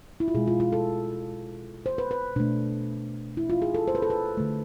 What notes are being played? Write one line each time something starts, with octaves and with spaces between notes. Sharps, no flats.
E4
F4
B2 G#3 G#4
F4
F4
A4
C5
B4
B4
B2 A3 D4
E4
F4
G#4
A4
C5
B4
A4
B4
D3 A3